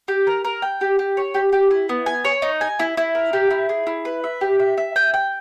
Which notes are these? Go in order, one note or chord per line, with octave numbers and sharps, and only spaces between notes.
G4
A#4
A#4
G5
G4
G4
C#5
G4
G4
E4
B3
G#5
C#5
D#4
G#5
E4
E4
A#4
G4
E4
G#4
E4
B4
E5
G4
E5
E5
G5
G5